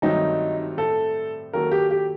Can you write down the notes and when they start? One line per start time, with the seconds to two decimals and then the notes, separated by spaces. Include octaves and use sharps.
0.02 G2 D#3 F#3 A3 C4 D#4
0.78 A2 A3 C4 A4
1.53 D#3 F#3 A#3 F#4 A4 A#4
1.71 G4
1.90 G4